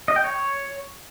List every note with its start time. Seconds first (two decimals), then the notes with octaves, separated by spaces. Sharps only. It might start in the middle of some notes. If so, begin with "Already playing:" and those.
0.08 D#5
0.16 G5
0.24 C#5